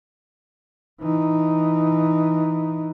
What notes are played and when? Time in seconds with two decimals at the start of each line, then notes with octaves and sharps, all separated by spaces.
1.01 E3 D#4